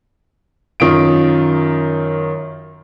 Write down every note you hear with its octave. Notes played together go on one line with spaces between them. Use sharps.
F#2 D#3 F4 D7